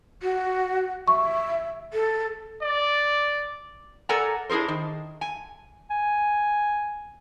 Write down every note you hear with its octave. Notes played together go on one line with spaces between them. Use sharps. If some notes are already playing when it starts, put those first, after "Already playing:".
F#4
E5 C#6
A4
D5
A4 A#4 D5 F#5 G#5 A#5
D4 E4 G#4 A#4 C5
D#3
G#5
G#5